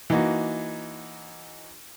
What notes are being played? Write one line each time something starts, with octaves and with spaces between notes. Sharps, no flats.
E3 A#3 D#4 F#4